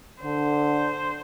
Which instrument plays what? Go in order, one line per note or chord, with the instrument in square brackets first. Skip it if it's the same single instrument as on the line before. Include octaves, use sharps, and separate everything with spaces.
[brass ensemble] D3 [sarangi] C5